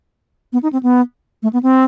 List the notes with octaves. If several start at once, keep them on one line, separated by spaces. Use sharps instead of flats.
B3
D#4
C4
B3
A3
B3
C4